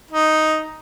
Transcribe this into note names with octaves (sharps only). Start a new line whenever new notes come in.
D#4